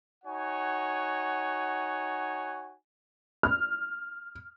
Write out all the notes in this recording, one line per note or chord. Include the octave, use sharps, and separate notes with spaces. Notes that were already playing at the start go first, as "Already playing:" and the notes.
D#4 F#4 C#5 F#5 G#5
F6